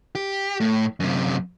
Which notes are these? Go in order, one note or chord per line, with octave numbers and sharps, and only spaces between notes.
G4
A2
F#2 C3